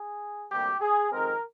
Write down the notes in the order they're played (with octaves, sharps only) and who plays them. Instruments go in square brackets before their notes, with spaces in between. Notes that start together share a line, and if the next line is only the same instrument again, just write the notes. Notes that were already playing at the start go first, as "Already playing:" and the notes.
Already playing: [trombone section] G#4
D2 C3 G3 A#3 G4
G#4
F2 D#3 G#3 C4 A#4